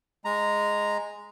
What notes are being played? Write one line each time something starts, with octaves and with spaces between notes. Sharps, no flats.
G#3 A#5